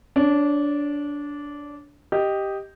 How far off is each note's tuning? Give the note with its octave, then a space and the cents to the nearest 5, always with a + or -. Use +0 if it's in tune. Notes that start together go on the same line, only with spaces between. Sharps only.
D4 -15 C#5 +0
G4 +0 D#5 +0